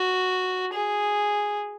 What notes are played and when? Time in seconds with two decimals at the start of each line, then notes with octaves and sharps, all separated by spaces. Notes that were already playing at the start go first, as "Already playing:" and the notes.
Already playing: F#4
0.74 G#4